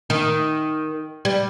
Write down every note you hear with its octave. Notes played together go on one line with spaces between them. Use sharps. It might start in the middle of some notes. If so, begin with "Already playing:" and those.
D#3
G3